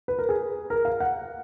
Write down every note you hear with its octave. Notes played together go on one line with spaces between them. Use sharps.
B4
A#4
G#4
A#4
F5
F#5